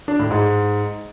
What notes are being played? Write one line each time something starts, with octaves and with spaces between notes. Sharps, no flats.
D4
A2
G#2